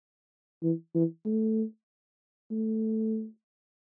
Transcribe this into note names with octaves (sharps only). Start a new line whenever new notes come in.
E3
E3
A3
A3